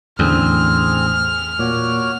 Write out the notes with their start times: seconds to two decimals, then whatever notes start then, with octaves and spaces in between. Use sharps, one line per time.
0.19 A1 E2 D3 C4 G#4 F6
1.59 A#2 F#4 C#5 D6